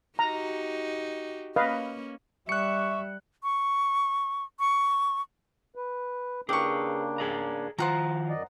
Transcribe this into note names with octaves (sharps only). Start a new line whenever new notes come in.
D#4 F#4 G4 A#5
A#3 C#4 B4 D#5 F5
G3 E5 C#6 F#6 C#7
C#6
C#6
B4
C#3 A#3 D4 G4 G#4 B4 C#6
G#4 D5 A#5
D#3 F3 F4 C5 F#5 A#5
F#2 D5 D#5